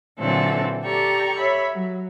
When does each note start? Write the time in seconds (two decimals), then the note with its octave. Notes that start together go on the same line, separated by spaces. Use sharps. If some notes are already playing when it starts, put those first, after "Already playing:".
0.19 A#2 D3 E3 F#3 C4 A4
0.84 G4 A4 D5 G5 A#5 C#6
1.38 C#5 E5 B5
1.72 F#3